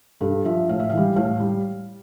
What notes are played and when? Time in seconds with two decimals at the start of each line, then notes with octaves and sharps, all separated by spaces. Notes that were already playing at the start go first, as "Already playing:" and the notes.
0.21 G2 A4
0.45 F3 E5
0.69 A2 F5
0.80 E5
0.90 E3 F5
0.97 G3
1.16 A2 F5
1.40 G3